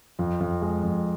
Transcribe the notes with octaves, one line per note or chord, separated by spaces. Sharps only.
F2
F2
G#3
F2